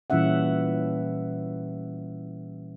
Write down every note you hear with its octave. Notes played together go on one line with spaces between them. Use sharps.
A#2 E3 G3 C#4 E5 F#5